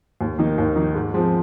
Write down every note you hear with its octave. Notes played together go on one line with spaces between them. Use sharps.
D#2
D#3 A#3 D#4
D#2
D#3 A#3 D#4
G#2
F3 G#3 C4